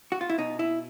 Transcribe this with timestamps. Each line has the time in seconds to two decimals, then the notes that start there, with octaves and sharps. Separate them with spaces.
0.12 F#4
0.21 F4
0.30 E4
0.38 B2 D#4
0.59 E4